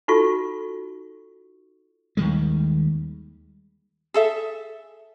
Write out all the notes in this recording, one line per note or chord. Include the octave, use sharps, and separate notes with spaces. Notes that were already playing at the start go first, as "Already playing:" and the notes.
D#4 F4 F#4 A4 C#6
D#2 D#3 G3 G#3
G#4 A4 E5